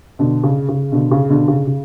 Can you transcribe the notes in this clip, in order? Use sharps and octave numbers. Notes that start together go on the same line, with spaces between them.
B2 D3
C#3
C#3
B2 D3
C#3
B2 D3
C#3
C#3